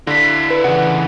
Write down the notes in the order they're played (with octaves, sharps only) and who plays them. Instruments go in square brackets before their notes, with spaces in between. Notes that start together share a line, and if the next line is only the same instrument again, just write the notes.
[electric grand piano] D3 [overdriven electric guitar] E4 F5 [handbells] A#6 B6
[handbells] B4
[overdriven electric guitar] C#3 E3 [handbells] F#5